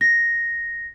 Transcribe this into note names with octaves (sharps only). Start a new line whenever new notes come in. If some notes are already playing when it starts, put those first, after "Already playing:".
A#6